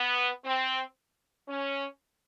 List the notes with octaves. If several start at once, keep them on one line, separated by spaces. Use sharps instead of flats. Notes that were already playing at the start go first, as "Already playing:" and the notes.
Already playing: B3
C4
C#4